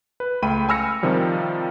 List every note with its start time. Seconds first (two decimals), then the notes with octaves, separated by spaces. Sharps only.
0.20 B4
0.42 C#2 A3 G5 B5 D#7
0.69 G#5 B5 E6 F6 A#6 C#7
1.03 C3 D#3 F3 G3